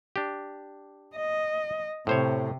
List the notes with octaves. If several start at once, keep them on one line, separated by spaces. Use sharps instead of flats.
D4 G4
D#5
A2 C3 C5 C#5